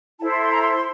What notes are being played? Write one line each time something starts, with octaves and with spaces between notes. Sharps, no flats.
E4 A4 C5 A5
C6
C6
A#5
C6
C6